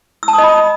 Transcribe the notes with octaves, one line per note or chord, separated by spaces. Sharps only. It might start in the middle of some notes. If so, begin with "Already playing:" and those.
E6
A5
D#6
D#5
B5